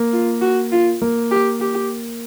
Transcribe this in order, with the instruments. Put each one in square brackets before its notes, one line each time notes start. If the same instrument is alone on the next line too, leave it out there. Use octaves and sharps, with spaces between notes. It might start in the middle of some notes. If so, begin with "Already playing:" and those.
Already playing: [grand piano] A#3
[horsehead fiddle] F4
F#4
F4
[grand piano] A#3
[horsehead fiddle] G4
G4